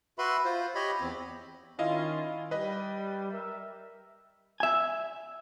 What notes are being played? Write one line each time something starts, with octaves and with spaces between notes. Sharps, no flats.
F#4 B4 E5 B5 C6
F4 C5
G4 C#5 D#5 B5
E2 C4
D#3 C#4 E4 F4 D#5 F5
G3 B4 D#5
A#4 E5
E5 G#5